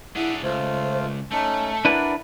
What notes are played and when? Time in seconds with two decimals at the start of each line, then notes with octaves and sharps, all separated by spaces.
0.16 D4 E4 G#4 E5 F#5
0.43 C#2 A3 F4 C5
1.32 A3 C#4 D#4 A5
1.85 D4 E4 A#4 B4 D5 F#5